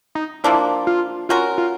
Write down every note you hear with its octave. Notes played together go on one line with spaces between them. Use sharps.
D#4
F3 A#3 D4 E4
F4
C#4 F4 F#4 A#4
F4